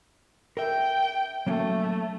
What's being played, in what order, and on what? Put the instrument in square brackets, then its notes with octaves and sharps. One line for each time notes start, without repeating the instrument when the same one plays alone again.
[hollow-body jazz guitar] A#4 E5 [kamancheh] G5
[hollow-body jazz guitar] F#3 A#3 C#4 [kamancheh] A3